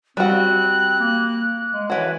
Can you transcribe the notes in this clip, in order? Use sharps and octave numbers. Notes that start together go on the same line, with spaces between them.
G3 C4 F#4 F#6
A#3
G#3
E3 F#4 C#5